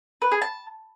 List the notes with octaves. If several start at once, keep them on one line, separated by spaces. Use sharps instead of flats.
B4
G#4
A5